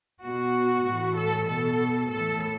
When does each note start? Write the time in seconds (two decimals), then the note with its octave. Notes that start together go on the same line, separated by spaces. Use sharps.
0.24 B2 F#4
0.87 A2 E3
1.18 A4
1.49 B2 A4
2.11 A2 E3 A4